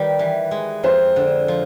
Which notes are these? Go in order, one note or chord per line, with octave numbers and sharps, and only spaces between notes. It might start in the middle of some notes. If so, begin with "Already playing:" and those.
Already playing: D#3 G3 B4
E3
G#3
F2 C5
D3
F3